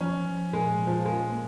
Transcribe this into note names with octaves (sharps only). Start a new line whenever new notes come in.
F3 C#4
F3
A#2 G#3
A#2
F3
G#3 C#4
A#3